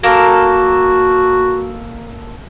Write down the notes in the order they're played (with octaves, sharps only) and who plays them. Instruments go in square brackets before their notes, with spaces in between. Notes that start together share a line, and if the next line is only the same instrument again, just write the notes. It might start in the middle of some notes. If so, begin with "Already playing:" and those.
[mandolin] A#3 A4 A#4 [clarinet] F#4